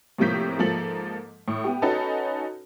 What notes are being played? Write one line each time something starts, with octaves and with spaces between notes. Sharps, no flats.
A2 C3 F3 A#3 G6 B6
G#2 F3 A#3 A4 F#7
A2
B3 G4
C#4 D#4 F#4 A4 B4 A5